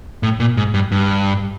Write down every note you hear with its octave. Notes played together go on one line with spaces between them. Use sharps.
A2
A#2
G#2
G2
G2